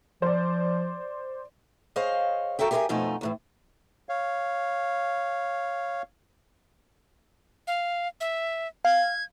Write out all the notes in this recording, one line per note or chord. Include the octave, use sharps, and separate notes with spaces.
F3 C5 D5
G#4 C5 C#5 D#5 F5
F#4 A4 A#4 E5 G5
G4 G#4 A#4 C5 E5 G#5
F2 B2 F3 A3 D#4 G#5
D#2 A2 E3
C#5 F5
F5
E5
F5 G#6